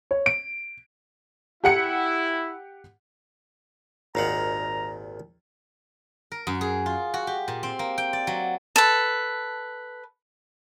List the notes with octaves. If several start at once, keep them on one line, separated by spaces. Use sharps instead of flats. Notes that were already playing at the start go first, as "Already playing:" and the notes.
C#5
D7
E4 G4 F#5 C#7
G#1 D#2 A#2 D#3 F5 F#5 A#5
A#4
F#2
G#4
F4
F#4
G4
A#2
C4
A#3
G5
D5
F#3
A4 B4